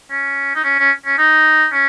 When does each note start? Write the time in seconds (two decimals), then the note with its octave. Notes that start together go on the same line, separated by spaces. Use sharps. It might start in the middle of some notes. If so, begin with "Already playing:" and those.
0.11 C#4
0.55 D#4
0.64 C#4
0.79 C#4
1.06 C#4
1.18 D#4
1.72 C#4